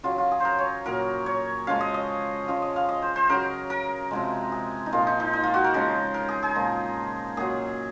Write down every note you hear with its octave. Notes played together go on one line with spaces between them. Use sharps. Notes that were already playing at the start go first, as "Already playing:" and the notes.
C#3 F#3 F4
F4
G#4
A#4 C5
C#5
A#2 F#3 A#4
C#5
C#3 F3 G#3 F5
D#5
D#5
C#3 F3 G#3 F5
D#5
F5
D#5
C5
C5
C#3 F#3 A#4
A#4
C3 F3 G#3
G#4
D#4
A#2 F3 G#3 F4
D#4
D#4
D#4
F4
F#4
A#4
C#3 F3 G#3
A#4
G#4
G#4
A#2 F3 G#3
A#2 F#3 G#4